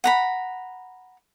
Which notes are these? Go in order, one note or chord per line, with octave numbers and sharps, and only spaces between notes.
F#5 A#5 B5